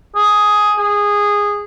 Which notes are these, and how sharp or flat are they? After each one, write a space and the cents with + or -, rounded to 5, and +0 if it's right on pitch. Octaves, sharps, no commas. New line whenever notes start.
G#4 +5
G#4 -15